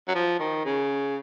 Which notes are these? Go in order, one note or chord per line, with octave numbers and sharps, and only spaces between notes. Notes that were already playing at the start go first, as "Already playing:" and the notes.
F#3
F3
D#3
C#3